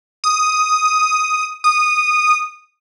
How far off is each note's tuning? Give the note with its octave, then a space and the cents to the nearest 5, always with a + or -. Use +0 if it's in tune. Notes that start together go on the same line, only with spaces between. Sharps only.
D#6 +5
D#6 -15